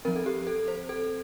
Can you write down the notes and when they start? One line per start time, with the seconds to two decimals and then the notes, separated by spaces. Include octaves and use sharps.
0.05 F3 C4 A#4
0.16 A4
0.26 G4
0.47 A4
0.68 C5
0.89 A4